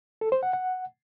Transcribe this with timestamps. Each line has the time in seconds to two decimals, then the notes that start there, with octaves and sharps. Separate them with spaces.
0.21 A4
0.32 C5
0.43 F#5
0.53 F#5